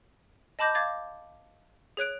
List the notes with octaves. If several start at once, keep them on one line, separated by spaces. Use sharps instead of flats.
D#5 A5 B5 D6 G6 A#6
F5 D6 G#6 A6
G#4 C#5 F#6 D7